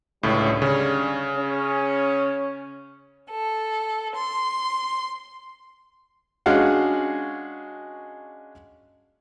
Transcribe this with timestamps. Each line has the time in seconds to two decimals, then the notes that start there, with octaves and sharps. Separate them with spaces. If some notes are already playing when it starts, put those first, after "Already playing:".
0.23 C#2 A2 D3 G3 C#4
0.62 C#3
1.36 C#4
3.30 A4
4.15 C6
6.46 G#3 C#4 D4 F#4 F5 F#5